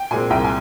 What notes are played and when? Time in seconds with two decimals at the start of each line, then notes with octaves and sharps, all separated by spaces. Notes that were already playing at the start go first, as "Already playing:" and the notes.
Already playing: G5
0.11 A#2 G#3 C4 G#5
0.30 C2 G5
0.44 G#5